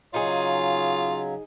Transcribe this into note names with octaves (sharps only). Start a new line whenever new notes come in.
C#3 F#3 D#4 F4 G#4 C#5